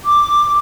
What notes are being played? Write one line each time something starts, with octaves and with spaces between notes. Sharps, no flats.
D6